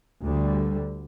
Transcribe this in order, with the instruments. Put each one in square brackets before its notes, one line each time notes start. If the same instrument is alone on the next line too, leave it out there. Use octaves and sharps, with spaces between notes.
[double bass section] D2 D3 G3